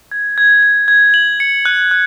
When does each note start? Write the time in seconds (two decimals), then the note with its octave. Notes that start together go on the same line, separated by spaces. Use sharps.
0.11 G#6
0.38 G#6
0.63 G#6
0.88 G#6
1.14 F#7
1.40 C#7
1.65 F#6
1.91 F#6